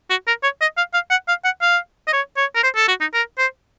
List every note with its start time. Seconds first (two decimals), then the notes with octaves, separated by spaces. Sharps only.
0.10 F#4
0.27 A#4
0.43 C#5
0.61 D#5
0.77 F5
0.94 F5
1.11 F#5
1.28 F5
1.45 F#5
1.62 F5
2.08 D#5
2.13 C#5
2.37 C#5
2.55 A#4
2.63 C5
2.76 A4
2.88 F#4
3.01 D#4
3.14 A#4
3.38 C5